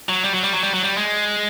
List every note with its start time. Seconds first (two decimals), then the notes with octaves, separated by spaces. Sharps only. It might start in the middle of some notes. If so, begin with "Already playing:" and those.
0.09 F#3
0.24 G3
0.33 F#3
0.43 G3
0.53 F#3
0.63 G3
0.73 F#3
0.83 G3
0.97 G#3